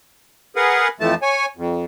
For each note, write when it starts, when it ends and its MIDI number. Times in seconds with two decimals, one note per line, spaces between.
0.56 0.88 68
0.56 0.88 70
0.56 0.88 71
0.56 0.88 78
1.00 1.14 41
1.00 1.14 52
1.00 1.14 53
1.00 1.14 57
1.00 1.14 81
1.22 1.46 73
1.22 1.46 80
1.57 1.85 41